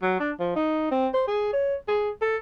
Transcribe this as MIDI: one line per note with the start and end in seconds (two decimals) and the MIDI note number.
0.03 0.19 54
0.20 0.32 62
0.40 0.55 53
0.56 0.89 63
0.91 1.08 60
1.14 1.23 72
1.28 1.51 68
1.53 1.75 73
1.88 2.10 68
2.22 2.37 69